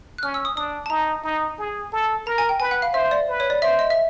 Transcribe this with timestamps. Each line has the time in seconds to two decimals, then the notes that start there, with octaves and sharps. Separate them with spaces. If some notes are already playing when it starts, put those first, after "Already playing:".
0.18 F#6
0.23 C#4 F6
0.34 E6
0.45 D#6
0.56 D4 D#6
0.86 A5
0.90 D#4 A#5
1.24 D#4
1.59 G#4
1.93 A4
2.26 A#4 A#5
2.38 G#5
2.49 G5
2.60 B4 G#5
2.71 F#5
2.82 F5
2.94 C5 E5
3.11 D5
3.28 B4
3.40 C#5
3.50 D5
3.62 C5 E5
3.79 D#5
3.90 E5